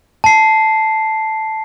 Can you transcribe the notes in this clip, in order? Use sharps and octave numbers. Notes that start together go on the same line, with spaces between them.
A5 C7